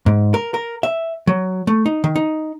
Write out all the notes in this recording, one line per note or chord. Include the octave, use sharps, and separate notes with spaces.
G#2
A#4
A#4
E5
F#3
A3
D#4
D#3
D#4